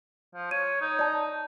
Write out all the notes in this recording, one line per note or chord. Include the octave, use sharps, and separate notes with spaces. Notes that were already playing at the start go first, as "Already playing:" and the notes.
F3
C#5 D#7
D#4
D5 A5